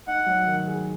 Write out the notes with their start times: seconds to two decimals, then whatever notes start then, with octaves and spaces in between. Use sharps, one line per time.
0.07 D#4 F#5
0.26 F#3
0.47 D#3
0.67 G#4